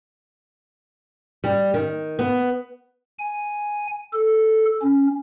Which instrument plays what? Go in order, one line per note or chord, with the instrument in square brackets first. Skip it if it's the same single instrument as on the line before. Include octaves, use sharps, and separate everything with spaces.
[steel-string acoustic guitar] G3
D#3
B3
[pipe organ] G#5
A4
C#4